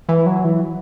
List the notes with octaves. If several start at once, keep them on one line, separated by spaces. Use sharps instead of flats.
E3
F#3
E3